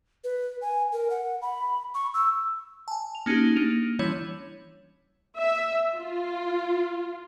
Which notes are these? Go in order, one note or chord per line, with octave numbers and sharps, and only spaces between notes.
B4
G#5
A#4
F#5
B5
C#6
E6
G#5 A5
F7
A#3 C#4 D#4 F#4 G4
A#3 D4 D#7 F7
E3 G3 C#4 E4 C#5
E5
F4